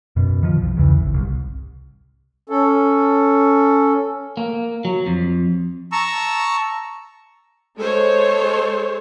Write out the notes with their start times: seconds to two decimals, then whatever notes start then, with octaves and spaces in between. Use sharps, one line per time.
0.16 F#2 B2
0.43 D#3 F3
0.61 C2
0.77 E2 C#3 E3
1.00 G#1
1.14 C2
2.50 C#4 A4
4.37 A#3
4.85 F#3
5.07 F2
5.92 A5 A#5 C#6 E6
7.77 G#3 A4 C5 C#5